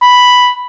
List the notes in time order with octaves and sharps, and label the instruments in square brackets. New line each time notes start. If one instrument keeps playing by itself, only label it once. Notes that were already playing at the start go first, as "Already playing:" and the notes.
[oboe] B5